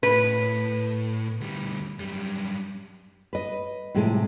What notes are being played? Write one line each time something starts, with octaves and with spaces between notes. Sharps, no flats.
A2 B4
D2 G3
F#2 G3
B4 D#5
A2 C3 F3 G#3